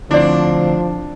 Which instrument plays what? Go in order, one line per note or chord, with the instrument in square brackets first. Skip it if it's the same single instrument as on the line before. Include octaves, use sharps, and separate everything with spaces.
[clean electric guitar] D2 C4 [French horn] F3 [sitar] D4 [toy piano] E4 D5